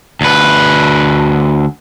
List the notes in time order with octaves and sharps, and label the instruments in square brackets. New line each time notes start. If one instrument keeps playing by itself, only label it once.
[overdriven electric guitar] D2 B4